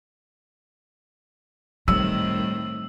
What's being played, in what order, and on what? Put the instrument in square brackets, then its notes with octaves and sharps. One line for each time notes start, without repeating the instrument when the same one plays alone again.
[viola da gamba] A2 D#3 C4 [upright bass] G3 [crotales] E6